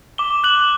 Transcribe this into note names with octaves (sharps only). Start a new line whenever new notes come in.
D6 G7
F#6 F#7